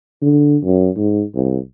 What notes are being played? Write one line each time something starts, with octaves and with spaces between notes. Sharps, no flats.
D3
F#2
G#2
C2